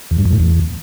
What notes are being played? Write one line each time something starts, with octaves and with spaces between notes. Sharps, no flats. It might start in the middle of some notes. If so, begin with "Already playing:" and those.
E2
G2
F2
A2
E2